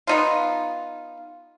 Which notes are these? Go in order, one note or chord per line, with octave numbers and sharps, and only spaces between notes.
B3 D#4 F4